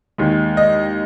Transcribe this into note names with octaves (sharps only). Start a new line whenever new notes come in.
D#2 D#3 G#3
D#5